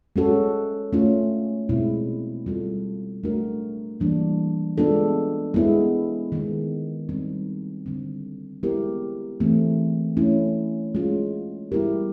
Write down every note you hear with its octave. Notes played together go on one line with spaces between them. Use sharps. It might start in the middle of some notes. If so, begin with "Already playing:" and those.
G#3 C#4 F#4 A4
A3 C#4 F4
B2 G#3 C4 E4
G3 C4 F4 A4
A3 D4 F#4 A#4
E3 G3 A#3 D4
G#3 B3 D4 F4 A4
G#3 B3 E4 G#4
D#3 G#3 B3
G3 C4 D#4
D3 G3 C4
G#3 B3 E4 G4 A#4
E3 A3 C4
A3 C#4 E4
G#3 C#4 F4
G3 B3 E4 G4 A#4